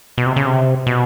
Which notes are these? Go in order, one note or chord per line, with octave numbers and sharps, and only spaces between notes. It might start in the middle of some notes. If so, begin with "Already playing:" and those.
B2
C3
C#3
C3
B2